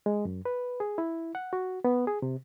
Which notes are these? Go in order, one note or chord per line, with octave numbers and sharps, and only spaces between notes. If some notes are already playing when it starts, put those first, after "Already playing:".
G#3
F#2
B4
G#4
E4
F#5
F#4
B3
G#4
C3